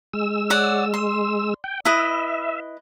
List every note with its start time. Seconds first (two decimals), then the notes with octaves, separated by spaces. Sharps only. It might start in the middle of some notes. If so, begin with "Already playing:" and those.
0.13 G#3 E6
0.50 C#5 D5 F#5
0.94 C6
1.64 G5
1.85 E4 B4 D#5 E5